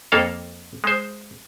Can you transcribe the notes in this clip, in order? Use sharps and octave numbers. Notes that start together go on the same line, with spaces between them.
F2 A#3 A4 F5
G#3 C5